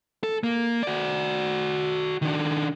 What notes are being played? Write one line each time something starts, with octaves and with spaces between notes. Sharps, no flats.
A4
A#3
F#4 D5
D#3 D4